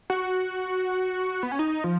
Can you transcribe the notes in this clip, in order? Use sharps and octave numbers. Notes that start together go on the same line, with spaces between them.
F#4
B3
C#4
D#4
F3